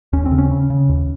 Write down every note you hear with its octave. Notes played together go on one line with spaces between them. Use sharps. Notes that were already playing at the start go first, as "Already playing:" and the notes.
D#2 C#4
C4
C#3
C#4
C#3
C#3
D#2